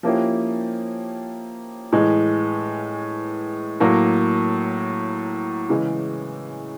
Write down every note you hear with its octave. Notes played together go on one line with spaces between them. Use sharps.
F3 A#3 C#4 E4 G4
A2 E3 G#3
A2 F#3 A#3
C#3 E3 G#3